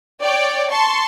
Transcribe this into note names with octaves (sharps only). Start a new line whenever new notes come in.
C#5 D5 G5
A5 C6 C#6